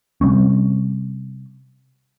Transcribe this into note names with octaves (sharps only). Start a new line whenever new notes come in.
C3 G3 C4 C#4